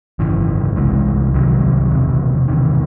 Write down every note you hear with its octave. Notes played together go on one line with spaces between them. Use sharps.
G#1 F#2 C#3 E3
C2 C3 E3 G#3
C2 C3 D#3 F#3
E1 E2 C3
E1 E2 C3 D#3